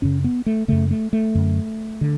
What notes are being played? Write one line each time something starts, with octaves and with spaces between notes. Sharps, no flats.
F#2 C#3 C#4
B3
A3
F#2 C#3 A3
A3
A3
F#2 D3
D3